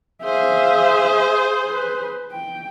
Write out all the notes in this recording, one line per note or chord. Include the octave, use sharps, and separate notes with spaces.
G#4 C5 E5 F5
B4
G5